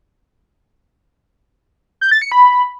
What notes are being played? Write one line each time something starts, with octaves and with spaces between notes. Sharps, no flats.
G6
A6
C#7
B5